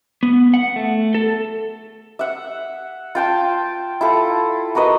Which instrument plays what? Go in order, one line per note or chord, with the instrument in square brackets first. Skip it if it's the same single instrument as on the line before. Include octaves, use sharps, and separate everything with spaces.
[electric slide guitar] B3
F#5
A3
A4
[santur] E5 F#5
F4 G5 A5
E4 F4 A4
F#4 A#4 B4 D#5